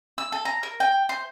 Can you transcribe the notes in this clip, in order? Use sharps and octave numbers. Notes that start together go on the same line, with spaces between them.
E6
A4
A#5
A#4
G5
C5